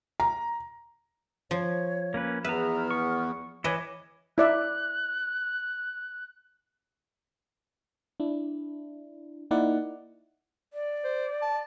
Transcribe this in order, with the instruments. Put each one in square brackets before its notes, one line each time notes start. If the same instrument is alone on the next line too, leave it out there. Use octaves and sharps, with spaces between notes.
[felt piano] A#5
[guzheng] F3 [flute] C#5
[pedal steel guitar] A#3 C#4 B4
[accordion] E2 B3 [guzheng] B4 [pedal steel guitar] E5 A#5 [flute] F6
[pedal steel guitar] C#6
[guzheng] E3 D#5 [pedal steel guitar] E4 B4 C#5 [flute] D6
[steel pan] E4 D5 E5 [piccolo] F#6
[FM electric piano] D4 E4
A#3 D#4 E4 D5 F#5
[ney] D5
[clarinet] C5
A5